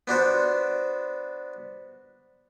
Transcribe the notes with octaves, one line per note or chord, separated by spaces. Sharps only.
B3 D4 F#4 C5